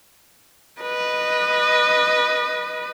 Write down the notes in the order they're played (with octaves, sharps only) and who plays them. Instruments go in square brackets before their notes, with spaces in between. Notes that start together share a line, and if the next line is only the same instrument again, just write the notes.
[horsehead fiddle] B4 D#5